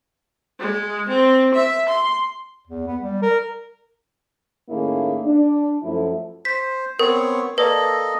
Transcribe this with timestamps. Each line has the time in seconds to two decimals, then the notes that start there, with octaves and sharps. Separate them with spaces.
0.59 G#3
1.08 C4
1.54 E5
1.88 C6
2.67 E2
2.87 B3
3.01 G3
3.22 A#4
4.70 A2 D#3 A#3 C#4 E4 G#4
5.24 D4
5.83 F#2 F3 A3 E4
6.45 C5 B6
6.99 B3 C4 A#4 C#5
7.58 A#3 A4 B4 D5 D#5